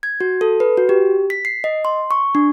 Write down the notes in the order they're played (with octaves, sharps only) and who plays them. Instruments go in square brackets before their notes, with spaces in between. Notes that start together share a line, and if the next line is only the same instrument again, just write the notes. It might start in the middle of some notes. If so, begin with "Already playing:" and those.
[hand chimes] G#6
F#4
A4
B4
F#4
G4
B6
C7
D#5
C6
C#6
D4